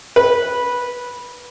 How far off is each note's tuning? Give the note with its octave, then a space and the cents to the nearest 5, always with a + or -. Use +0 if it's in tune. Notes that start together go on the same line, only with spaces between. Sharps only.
B4 -10